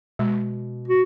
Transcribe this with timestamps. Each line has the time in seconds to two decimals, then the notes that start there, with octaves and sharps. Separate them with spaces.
0.19 B2 G#3
0.88 F#4